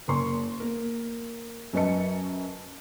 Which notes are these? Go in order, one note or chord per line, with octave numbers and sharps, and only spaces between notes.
F#1 A#3 C6 C#6
A#3 A#4
F#2 F#3 B4 D#5 A5 C#7